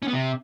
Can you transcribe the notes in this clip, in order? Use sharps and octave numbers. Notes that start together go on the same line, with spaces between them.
C#4
B3
C3